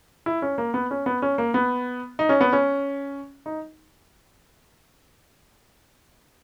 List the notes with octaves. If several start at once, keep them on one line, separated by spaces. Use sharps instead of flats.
E4
C#4
A#3
B3
C#4
B3
C#4
A#3
B3
D#4
C#4
B3
C#4
D#4